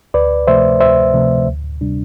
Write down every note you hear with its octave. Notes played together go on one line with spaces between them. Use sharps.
D2 B4 D5
C3 F3 A3 C5 E5
D2 C5 E5
C3 F3 A3
D2
C3 G3 D4